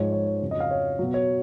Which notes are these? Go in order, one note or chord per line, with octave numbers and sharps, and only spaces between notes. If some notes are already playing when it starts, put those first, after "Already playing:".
Already playing: G#2 F3 G#3 C#5
C#5
C#5
F2 C#3 F#3
D#5
F5
C#5
B2 F#3
C#5